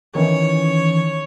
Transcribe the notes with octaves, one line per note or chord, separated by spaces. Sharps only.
D#3 E3 C#4 C#5